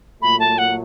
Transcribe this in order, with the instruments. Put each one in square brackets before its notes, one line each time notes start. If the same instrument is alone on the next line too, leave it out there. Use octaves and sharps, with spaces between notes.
[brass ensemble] A#2 F#3 A3 [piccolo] B5
[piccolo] A5
F#5